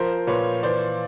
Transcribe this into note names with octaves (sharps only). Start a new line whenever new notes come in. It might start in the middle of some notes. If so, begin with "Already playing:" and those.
Already playing: F3 A#4 C5
A#2 B4 C#5
E3 C5 D5